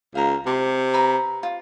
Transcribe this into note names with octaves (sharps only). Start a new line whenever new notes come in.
C#2 F5 A#5
C3 C6 D6
B4 A#5 B5
F4